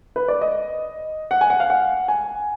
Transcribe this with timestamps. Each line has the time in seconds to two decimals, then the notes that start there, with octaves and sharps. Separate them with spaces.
0.16 B4
0.28 D5
0.41 D#5
1.31 F#5
1.41 G#5
1.50 F#5
1.60 F5
1.70 F#5
2.08 G#5